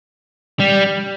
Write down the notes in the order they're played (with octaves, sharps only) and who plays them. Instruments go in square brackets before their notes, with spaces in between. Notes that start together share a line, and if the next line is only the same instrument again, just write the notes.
[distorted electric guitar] G3